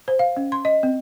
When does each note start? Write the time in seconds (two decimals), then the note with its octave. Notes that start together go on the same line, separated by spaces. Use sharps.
0.08 C5
0.19 F5
0.37 C#4
0.52 C6
0.65 D#5
0.83 C4